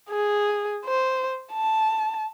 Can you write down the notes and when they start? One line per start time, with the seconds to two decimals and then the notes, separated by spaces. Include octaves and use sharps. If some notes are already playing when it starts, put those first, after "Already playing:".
0.10 G#4
0.85 C5
1.53 A5